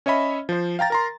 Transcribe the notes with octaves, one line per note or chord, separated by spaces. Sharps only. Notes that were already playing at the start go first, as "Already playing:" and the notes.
C#4 C#5 D#5 E5 B5
F3 C5
F5 G5 A#5 A6
A#4 A#5 C6